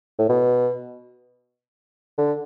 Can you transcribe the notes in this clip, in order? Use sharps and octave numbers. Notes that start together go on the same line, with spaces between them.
A2
B2
D3